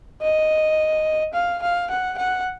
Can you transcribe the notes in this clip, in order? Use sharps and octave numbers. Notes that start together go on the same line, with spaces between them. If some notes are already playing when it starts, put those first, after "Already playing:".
D#5
F5
F5
F#5
F#5